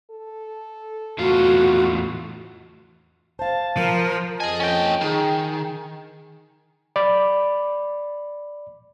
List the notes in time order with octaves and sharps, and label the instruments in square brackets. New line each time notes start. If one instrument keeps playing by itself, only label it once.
[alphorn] A4
[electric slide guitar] E2 A2 F4 [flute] F#4
[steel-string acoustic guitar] C5 F5 [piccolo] A5
[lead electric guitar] F3 [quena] A#4
[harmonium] F2 D#5 A5 [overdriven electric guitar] G#4 G#5
[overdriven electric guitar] C#4 G5
[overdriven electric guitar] D#3 [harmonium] G#4
[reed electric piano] D5 B5